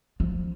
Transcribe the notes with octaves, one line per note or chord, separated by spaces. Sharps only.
F3